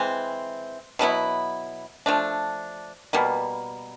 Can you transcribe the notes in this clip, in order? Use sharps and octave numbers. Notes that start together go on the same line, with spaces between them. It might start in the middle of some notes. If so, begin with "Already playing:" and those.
Already playing: E3 G#3 C4
B2 F#3 B3 E4
F3 A3 D4
B2 G3 A#3